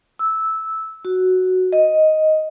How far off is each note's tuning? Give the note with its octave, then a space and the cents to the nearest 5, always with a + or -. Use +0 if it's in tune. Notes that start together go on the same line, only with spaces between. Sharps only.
E6 -10
F#4 +0
D#5 +5